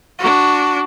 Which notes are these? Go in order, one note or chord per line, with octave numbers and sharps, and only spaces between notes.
D4 F#4